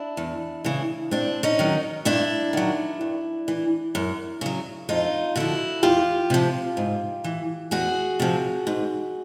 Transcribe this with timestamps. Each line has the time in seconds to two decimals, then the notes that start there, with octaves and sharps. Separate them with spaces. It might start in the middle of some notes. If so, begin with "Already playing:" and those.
Already playing: D4 E4
0.17 E2
0.64 C#3 E3
1.11 G2 C4 D4
1.43 C#4 D#4
1.59 D#3 F#3
2.05 G2 D4 E4
2.53 D#3 F#3
3.01 G2
3.48 E3
3.95 F#2
4.41 C#3 F#3
4.89 F2 D#4 F4
5.36 D3 F3 E4 F#4
5.83 E2 F4 G4
6.30 C3 F3
6.77 G#2
7.24 E3
7.71 E2 F#4 G#4
8.20 C3 F3
8.67 G#2